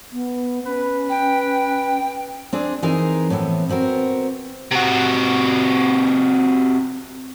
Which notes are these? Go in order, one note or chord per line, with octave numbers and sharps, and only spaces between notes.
B3
C#4 B4
G5
C4 D4 G#4
E3 C4 D#4 G#4 A#4
A2 E3 B3 C4
B3 C4 F#4 A#4
C3 F#4